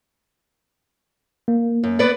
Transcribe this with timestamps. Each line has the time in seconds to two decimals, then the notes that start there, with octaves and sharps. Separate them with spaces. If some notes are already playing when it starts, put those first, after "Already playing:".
1.48 A#3
1.84 F#2
1.99 B3 B4 D5